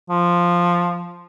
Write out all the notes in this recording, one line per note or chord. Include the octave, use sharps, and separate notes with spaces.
F3